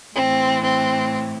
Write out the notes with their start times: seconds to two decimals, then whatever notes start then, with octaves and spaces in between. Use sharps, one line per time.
0.14 A2 E3 C4
0.63 C4